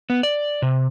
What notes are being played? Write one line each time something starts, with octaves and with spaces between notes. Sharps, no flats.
B3
D5
C3